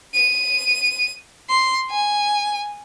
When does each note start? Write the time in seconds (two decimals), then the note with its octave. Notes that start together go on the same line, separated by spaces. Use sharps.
0.15 D#7
1.50 C6
1.90 G#5